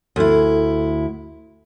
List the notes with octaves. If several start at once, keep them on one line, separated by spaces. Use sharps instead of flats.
D2 E4